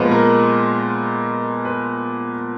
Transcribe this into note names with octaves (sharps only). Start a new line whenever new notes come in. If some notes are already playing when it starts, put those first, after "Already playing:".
Already playing: A#2 F3 G#3 B3 B4 C5
A#4
B4